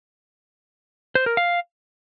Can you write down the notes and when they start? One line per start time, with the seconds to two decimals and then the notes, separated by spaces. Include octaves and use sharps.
1.15 C5
1.26 A#4
1.37 F5